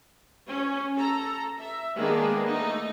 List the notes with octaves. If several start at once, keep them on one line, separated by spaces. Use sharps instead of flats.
C#4
A4 A#5
E5
D#3 G#3 A#3 B3 D4 G#4
A3 D#4